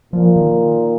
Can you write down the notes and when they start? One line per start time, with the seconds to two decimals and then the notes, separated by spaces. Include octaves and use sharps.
0.13 A#2 F3
0.36 D#3